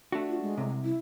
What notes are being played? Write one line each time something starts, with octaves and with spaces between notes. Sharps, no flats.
A3 D4 F#4
F4
G#3
C2 C3
E4